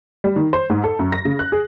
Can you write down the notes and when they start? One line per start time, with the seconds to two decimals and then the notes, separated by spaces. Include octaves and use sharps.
0.24 G3
0.36 D#3
0.53 C5
0.70 G#2
0.84 A4
0.99 F#2
1.12 A#6
1.25 C#3
1.39 F#6
1.52 G#4